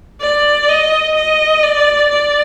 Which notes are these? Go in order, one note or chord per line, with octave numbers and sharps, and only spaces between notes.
D5
D#5
D#5
D5
D5